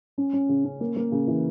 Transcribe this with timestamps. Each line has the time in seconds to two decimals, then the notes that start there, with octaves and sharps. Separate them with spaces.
0.18 C#4
0.33 C#4
0.49 C#3
0.64 C#4
0.80 A#3
0.96 A#3
1.12 C#3
1.27 E3